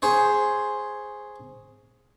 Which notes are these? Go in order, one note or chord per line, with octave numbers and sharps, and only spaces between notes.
G#4 C5 C#5